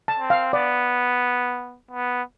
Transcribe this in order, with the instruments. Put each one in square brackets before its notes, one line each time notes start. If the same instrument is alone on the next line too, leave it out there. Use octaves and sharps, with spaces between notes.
[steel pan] A5
[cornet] C4
[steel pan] F5
[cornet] B3 [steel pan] D5
[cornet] B3